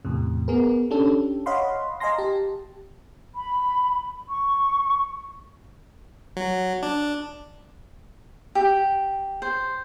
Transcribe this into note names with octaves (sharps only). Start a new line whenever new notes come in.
E2 A2 C3
B3 G#4 A#4
C#4 D4 G4 A4
C#5 D#5 F5 F#5 B5 C6
D#5 F5 G#5 A#5 C6 A#6
G4 A5
B5
C#6
F#3
D4
G4
C5